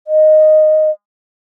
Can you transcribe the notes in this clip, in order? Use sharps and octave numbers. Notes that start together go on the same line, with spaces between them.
D#5